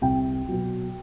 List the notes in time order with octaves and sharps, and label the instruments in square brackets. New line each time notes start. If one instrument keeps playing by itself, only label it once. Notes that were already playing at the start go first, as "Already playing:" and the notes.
[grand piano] C2 G5
B2 F#3